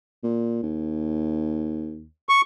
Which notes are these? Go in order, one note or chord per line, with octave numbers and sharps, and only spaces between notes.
A#2
D#2
C#6